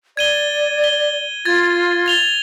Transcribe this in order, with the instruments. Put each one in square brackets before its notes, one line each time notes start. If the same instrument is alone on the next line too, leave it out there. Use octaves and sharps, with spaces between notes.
[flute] D5 [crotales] G#6 D#7 G7
[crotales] G7
[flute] F4 [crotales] G#6 A6
[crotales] A6 F7 G7